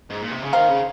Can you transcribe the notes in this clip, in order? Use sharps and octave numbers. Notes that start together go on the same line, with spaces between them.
G#2
A#2
C3
C#3
D#3 C5 F5 A#5
C#3